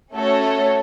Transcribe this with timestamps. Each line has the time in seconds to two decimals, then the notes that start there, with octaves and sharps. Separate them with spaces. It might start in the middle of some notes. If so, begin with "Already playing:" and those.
0.13 A3 C#4 F#4 A4 C#5